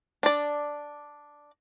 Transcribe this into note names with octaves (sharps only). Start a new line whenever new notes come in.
D4 D5